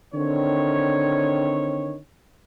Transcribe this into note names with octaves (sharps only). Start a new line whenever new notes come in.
D3 D#3 C4 C#5